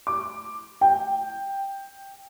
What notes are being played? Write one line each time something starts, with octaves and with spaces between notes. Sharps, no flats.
D6
G5